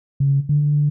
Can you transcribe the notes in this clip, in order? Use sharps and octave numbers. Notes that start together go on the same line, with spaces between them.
C#3
D3